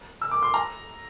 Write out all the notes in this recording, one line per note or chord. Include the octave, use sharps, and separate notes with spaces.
E6
D6
C6
A#5